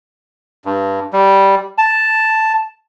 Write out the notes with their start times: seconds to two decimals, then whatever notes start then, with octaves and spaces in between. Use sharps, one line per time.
0.65 G2
1.13 G3
1.78 A5